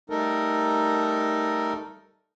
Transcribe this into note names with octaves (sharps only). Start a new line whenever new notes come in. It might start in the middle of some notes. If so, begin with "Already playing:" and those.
G3 A3 D#4 A4 A#4